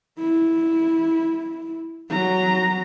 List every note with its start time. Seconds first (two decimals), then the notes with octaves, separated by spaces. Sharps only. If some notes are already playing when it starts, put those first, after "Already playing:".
0.19 E4
2.10 F#3 A#5